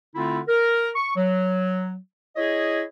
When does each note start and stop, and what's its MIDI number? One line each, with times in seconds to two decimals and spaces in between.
0.15 0.40 50
0.15 0.40 57
0.15 0.40 60
0.15 0.40 64
0.15 0.40 65
0.48 0.90 70
0.96 1.14 85
1.16 1.96 54
2.36 2.83 64
2.36 2.83 68
2.36 2.83 73
2.36 2.83 75